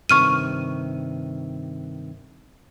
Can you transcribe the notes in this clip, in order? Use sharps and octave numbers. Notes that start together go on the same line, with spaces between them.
G2 C3 D#3 C#6 F6 D#7